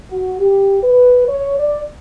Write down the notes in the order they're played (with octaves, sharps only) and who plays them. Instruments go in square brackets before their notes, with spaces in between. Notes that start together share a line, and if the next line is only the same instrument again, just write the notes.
[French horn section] F#4
G4
B4
C#5
D5